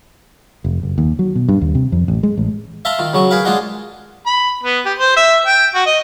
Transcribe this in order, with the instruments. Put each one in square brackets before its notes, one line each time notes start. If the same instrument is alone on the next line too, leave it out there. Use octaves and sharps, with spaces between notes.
[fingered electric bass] F1
F#1
D#2
F#3
B2
G2
D#2
C3
F2
A1
G#3
A1
[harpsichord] E5 F5 A5 A#5 C6
D#3 F4
C#3 F#3 C#6
G#4 A#4 B4 F5
G#3 D4 F4 G#4 D#5 F#5
[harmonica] B5
B3
G4
C5
E5
G5
F#4
D#5